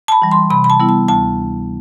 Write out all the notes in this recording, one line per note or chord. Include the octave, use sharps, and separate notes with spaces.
A5
B5
E3 G3
C6
C3 B5
B5
A5
G3 B3 E4
A5
D2 A5